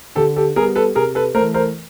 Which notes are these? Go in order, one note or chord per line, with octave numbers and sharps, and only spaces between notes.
D3 G4 A4
G4 A4
G3 B3 G#4 A#4
A4 B4
C3 G#4 A#4
A4 B4
A3 A#4 C5
E3
A#4 C5